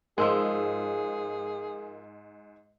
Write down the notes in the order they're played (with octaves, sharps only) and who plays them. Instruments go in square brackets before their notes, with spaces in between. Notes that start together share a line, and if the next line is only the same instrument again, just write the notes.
[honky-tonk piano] G#2 E6 [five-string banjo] F3 G#3 [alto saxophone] G#4 [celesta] A#4